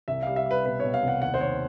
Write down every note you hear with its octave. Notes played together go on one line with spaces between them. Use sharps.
C2 E5
G3 F5
E5
G3 B4
B2 B4
B2 C#5
F5
C2
F#5
D#2 F#5
C5
D#2 C#5